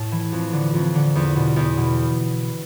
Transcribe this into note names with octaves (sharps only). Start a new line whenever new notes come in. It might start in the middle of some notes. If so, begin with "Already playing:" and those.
Already playing: A2 A5
E3
F2
D3
F2
D3
E2
B2
E2
B2